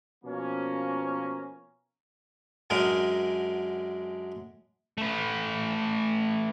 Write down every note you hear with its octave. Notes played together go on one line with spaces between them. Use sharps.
B2 F3 A#3 C#4
F#2 D3 G#3 A#4 D#5 A#5
A3 B4